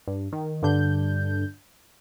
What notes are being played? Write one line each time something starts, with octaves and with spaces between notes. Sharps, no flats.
G2
D#3
G2 D3 D4 G6